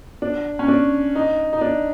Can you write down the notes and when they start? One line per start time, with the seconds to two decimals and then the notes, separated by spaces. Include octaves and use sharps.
0.22 D4
0.59 C#4
0.68 D4
1.15 D#4
1.53 D#4
1.61 D4